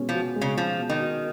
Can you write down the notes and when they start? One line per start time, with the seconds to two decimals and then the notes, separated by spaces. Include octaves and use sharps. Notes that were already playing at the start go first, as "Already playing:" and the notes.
Already playing: B2 G#3 C#4
0.09 F3
0.14 F#4
0.36 G#3
0.41 C#3
0.57 F3 C#4
0.79 B2
0.90 D#3
1.00 F#4